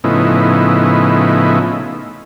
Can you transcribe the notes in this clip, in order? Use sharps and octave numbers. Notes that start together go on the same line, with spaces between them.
A2 C#3 F3 B3 D#4 E4